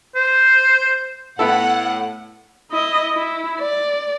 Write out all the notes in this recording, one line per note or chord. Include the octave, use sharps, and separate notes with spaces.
C5
A2 B3 E4 A4 F#5
E4 D#5
E4
D5